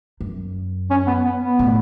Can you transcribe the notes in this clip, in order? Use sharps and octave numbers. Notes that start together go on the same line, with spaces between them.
F#2
C#4
B3
B3
B3
A2